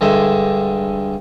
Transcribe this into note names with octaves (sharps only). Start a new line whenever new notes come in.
G2 D3 G#3 E5